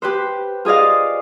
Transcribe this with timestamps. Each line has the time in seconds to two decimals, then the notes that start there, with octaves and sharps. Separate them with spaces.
0.02 G4 B4 C5
0.65 F4 G#4 D5 D#5 F5